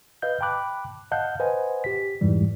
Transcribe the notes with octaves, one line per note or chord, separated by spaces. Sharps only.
B4 D#5 F5 G6
G5 A5 B5 D6 F#6
D#5 F5 F#5 A5 F#6 G6
B4 C5 D#5 F#5 G#5
G4 B6
F2 G#2 E3 G3